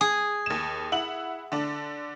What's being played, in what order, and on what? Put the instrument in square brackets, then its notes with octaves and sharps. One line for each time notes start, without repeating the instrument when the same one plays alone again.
[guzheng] G#4
[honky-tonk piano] D#2 E7
E4 F#5 F#7
D3 D4